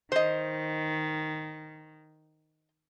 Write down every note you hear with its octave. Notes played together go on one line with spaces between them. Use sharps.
D#3 C5 D#5